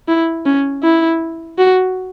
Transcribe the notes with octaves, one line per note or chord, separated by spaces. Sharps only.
E4
C#4
E4
F#4